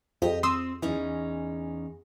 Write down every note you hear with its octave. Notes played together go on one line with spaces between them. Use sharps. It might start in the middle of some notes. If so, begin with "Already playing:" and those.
F2 G4 D#5
C4 C6 D#6 E6
E2 E3 C#4 D#4